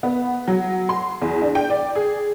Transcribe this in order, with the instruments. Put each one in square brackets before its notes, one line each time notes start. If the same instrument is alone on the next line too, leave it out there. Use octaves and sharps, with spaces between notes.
[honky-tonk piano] B3
F#3
C6
E2
D4
G5
D5
G#4